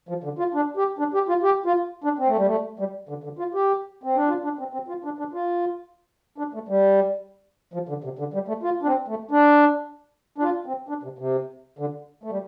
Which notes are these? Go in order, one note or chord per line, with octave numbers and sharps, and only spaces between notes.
F3
D3
F4
D4
G4
D4
G4
F4
G4
F4
D4
C4
A3
G3
A3
G3
D3
D3
F4
G4
C4
D4
F4
D4
C4
C4
F4
D4
D4
F4
D4
A3
G3
F3
D3
C3
D3
G3
A3
F4
D4
C4
A3
D4
D4
F4
C4
D4
C3
C3
D3
A3
G3